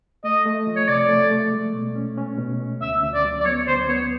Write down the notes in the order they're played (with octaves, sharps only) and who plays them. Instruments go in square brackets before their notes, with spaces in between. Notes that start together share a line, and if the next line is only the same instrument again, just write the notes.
[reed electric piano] A3 [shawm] D#5
[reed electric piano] A3
F3
[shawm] C#5
[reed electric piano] C3 [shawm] D5
[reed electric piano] A3
A3
G#3
B2
C#4
C#4
B2
C#4
[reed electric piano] D2 [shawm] E5
[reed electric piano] D2
[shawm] D5
[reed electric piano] F#3
[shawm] D5
[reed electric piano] B3 [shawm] C#5
[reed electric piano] D2 [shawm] C5
[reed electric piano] B3 [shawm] C#5